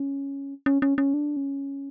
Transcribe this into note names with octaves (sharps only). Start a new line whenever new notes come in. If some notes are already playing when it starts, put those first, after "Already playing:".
Already playing: C#4
C#4
C#4
C#4
D4
C#4